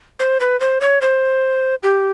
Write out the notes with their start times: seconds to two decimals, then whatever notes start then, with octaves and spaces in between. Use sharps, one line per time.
0.19 C5
0.40 B4
0.60 C5
0.81 C#5
1.01 C5
1.83 G4